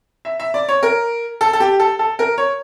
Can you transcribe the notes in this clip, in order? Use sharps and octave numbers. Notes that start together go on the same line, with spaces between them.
E5
E5
D5
C#5
A#4
A4
A4
G4
A4
A4
A#4
C#5